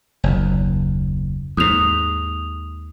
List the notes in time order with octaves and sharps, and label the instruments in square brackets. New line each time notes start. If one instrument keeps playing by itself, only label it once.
[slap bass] F#1 D#2
[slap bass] D#2 G#2 [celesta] D#6 F7